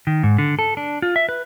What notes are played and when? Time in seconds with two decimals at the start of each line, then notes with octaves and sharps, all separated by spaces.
0.07 D#3
0.23 G#2
0.38 D3
0.59 A4
0.77 D4
1.02 F4
1.16 E5
1.29 B4